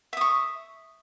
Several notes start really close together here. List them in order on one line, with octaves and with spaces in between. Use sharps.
E5 D#6 C#6